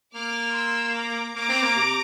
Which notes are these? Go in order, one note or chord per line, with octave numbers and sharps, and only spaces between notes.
A#3 D6 F6
C6 E6
A#5 D6
A#3 A#5 D6
C4
A#3
C3